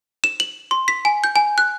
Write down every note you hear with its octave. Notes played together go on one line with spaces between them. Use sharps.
E7
F#7
C6
B6
G#5
G6
G#5
F#6